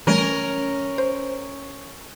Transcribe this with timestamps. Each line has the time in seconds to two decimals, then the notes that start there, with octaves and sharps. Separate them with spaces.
0.07 E3 G3 A3 C#4 A#4
0.98 C5